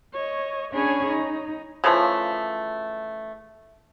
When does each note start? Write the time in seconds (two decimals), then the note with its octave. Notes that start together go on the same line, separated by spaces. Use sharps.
0.13 C#5 D#5
0.73 C#4 D4 G#4 C#5 G#5 B5
1.08 D#4
1.84 C#3 E3 F3 A3